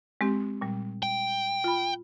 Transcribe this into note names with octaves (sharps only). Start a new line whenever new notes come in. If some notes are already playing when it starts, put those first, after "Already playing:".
G#3 C4 G4
A#2 G3
G5
F4 B5